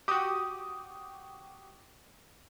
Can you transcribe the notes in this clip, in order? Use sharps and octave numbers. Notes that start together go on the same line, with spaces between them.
F#4 G4 D6 D#6